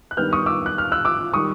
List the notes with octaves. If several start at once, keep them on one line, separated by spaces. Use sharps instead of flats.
F#6
G2 D#3 G3 B3 F6 G6
C#6 D#6
D6 E6
F#6
F6
E6 F#6
D6 E6
D#3 G3 C#6 D#6